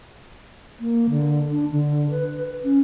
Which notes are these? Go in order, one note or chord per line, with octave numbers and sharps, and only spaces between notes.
A#3
D3
D4
D3
B4
C#4